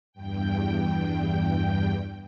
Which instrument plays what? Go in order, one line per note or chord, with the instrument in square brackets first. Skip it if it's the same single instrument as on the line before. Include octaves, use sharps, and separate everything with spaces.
[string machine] E2 G2 G5